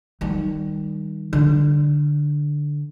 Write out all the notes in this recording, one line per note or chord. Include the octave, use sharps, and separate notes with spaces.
D#3 G3
D3